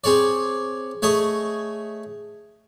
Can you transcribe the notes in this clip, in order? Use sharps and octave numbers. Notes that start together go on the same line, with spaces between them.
C4 G#4 C#5 D5
A3 G#4 C#5 D#5